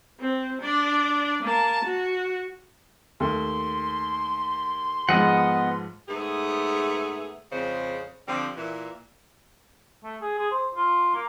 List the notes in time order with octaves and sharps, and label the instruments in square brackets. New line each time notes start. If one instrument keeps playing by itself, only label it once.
[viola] C4
D4 D5
A#3 A5
F#4
[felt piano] D#2 A3 [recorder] C6
[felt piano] G#2 F3 [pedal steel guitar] B3 D#5 F#5
[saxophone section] G#2 A3 B3 G#4
F2 C#3 G#3 C5
D3 F3 G3 C4
A#2 E3
[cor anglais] A3
G#4
G#4
C5
F4
A#3